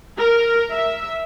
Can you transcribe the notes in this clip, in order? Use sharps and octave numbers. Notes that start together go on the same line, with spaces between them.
A#4
E5